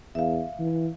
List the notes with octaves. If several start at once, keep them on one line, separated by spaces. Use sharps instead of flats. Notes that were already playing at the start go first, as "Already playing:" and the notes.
E2 E5 F5
E3